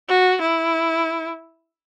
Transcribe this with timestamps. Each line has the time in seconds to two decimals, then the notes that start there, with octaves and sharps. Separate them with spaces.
0.09 F#4
0.42 E4